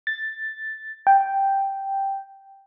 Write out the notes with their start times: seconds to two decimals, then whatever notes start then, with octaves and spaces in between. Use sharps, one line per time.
0.07 A6
1.07 G5